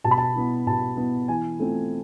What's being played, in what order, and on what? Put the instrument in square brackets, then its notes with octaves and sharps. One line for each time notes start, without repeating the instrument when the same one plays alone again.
[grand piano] B2 A5
B5
A5
B3 E4
B2 A5
B3 E4
E3 G#5
A3 C4 F4